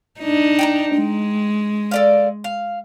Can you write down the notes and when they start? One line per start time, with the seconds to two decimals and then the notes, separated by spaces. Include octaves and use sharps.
0.20 D4 D#4
0.59 G5 G#5 A#5
0.97 G#3
1.91 A4 D5 F5
2.44 F5